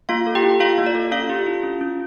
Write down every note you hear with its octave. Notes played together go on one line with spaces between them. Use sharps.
A#3 F4 F5
A4
G4 G5
E4
A#3 F4 F5
A#3
D5
A4
C#4 F4 F5
G4
E4
C#4
C#4